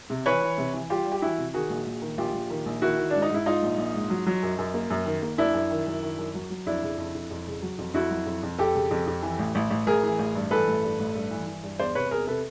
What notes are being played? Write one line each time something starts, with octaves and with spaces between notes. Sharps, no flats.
C3
E3 B4 C#5
E3
C3
E3
G3 F4 G4
G3
G4
E3 E4 F#4
C3
D#3 F#4 G#4
A#1
A#1
D#3
A#1 F4 G4
A#1
D#3
A#1
D#3 E4 F#4
D#3
G#2 D4
D#4
G#2 E4
G#2 D#4 F4
A#1
A#1
G#2
F#3
F#3
F#2
F#2
A#3
F#2
D#3
A#3
F#2 D4 E4
F#2
D#3
F#2
D#3
F#2
F#3
F#3
F2 D4 E4
C#3
F2
F2
F2
C#3
F#3
F2
F2 E4 F#4
F#3
F2
F2
F2 G4 A4
C#3
F2
F2
E3
A1
A1
A1
A1 G#4 A#4
E3
A1
G2
E3 A4 B4
A1
G2
A1
G2
E3
E3
G2
E2 C5 D5
C3 B4 C#5
E2 G#4 A#4
C3 A4 B4